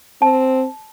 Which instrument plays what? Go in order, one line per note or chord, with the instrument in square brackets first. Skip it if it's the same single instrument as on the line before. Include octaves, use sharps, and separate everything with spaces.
[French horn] C4 [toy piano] A5